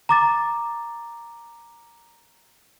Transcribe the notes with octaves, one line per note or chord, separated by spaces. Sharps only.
A#5 D6 A6